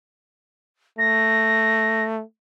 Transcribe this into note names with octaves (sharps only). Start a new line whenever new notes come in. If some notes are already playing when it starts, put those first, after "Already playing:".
A3 A#6